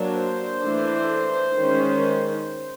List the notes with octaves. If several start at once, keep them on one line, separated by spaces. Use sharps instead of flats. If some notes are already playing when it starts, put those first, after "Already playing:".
Already playing: F#3 A#3 D4
C5
E3 A3 D4
D#3 G#3 C#4